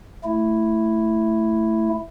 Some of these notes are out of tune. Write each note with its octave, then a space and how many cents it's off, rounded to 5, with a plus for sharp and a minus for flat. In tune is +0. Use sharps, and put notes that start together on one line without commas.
A3 +5 E4 +0